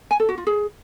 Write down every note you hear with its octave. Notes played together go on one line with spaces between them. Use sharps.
G#5
A4
F#4
F4
G#4